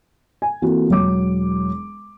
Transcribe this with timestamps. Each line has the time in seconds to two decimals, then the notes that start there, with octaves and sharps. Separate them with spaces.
0.42 G#5
0.62 E3 A#3 C4 F4 F#4 A4
0.89 E1 F#3 D6